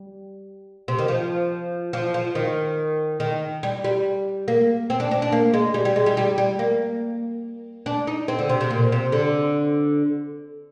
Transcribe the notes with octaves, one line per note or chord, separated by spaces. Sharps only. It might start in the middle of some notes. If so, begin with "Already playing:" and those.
Already playing: G3
C3
D#3
F3
F3
F3
D#3
D#3
G3
G3
A#3
C4
D4
D4
D4
A#3
G#3
G3
G3
G#3
G3
G3
G3
A#3
D4
D#4
C4
D3
C3
C3
A#2
C3
D3